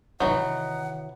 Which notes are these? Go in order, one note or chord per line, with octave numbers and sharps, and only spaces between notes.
C3 D#3 E3 F#3 D#4 F#5